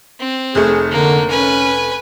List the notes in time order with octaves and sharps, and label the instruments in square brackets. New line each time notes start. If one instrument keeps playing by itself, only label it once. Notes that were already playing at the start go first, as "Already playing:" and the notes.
[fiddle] C4
[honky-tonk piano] F1 A3 [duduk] G#4
[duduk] D3 [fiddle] A#3
[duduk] C#4 [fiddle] B4 G#5